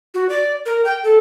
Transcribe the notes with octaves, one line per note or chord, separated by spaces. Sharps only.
F#4
D5
A#4
G5
A4